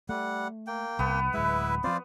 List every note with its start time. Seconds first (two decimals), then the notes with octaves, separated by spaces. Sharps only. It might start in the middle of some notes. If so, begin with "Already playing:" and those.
0.09 G3 A3 F#5
0.67 A#3 G5
0.99 C2 B3
1.34 D1 G#3 E4 B4 E5
1.84 F3 C4 F4 C5 D5